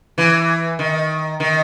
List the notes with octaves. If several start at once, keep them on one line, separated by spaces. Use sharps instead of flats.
E3
D#3
D#3